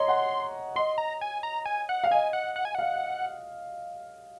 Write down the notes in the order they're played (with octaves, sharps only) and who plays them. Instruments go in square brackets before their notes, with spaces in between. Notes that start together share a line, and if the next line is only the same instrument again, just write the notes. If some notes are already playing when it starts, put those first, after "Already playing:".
Already playing: [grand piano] C#5 D#5 A#5 [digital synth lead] C6
[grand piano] F#5
[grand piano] D#5 [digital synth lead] C6
[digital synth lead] A#5
G#5
A#5
G#5
F#5
[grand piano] F5
[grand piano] D#5 [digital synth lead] G#5
[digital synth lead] F#5
F#5
G#5
[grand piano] F5 [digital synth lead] F#5